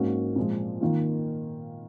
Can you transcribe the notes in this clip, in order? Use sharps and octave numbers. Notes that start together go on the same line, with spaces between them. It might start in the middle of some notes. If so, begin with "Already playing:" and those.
Already playing: G#2 F#3 A#3 C#4 F#4
A#2 F3 G#3
D#3 A#3 F4